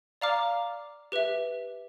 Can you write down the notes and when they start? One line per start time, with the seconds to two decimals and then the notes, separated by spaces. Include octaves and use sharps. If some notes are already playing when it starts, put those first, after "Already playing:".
0.21 D5 F5 A#5 D6 F6
1.12 G4 B4 E5